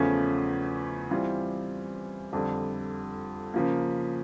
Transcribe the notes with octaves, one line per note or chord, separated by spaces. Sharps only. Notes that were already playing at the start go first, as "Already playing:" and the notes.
Already playing: E2 C#3 F3 A3 C#4
E3 G3 C4 F4
F2 D3 G3
C#3 F3 A#3